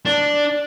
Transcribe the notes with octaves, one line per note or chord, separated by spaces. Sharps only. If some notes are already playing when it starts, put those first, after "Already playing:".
D4